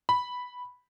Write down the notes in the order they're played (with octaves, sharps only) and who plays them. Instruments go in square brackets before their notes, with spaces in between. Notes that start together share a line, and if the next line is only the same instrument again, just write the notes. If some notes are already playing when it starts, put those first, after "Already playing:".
[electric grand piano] B5